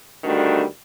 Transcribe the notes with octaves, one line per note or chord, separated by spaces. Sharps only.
D2 D#3 G3 A3 D4 F#4